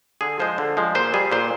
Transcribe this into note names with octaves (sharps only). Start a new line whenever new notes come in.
D3 G#4
F3 G#3 C5
D3
F3 G#3
A#2 C5
G3 G#4
A#2 C5